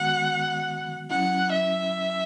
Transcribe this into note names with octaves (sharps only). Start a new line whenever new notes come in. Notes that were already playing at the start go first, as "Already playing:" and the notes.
Already playing: D#3 G#3 B3 F#4 F#5
F#3 C#4 E4 F#5
E5